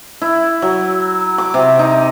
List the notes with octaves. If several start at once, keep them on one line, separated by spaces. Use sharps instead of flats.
E4
F#3
D6
C3
D#4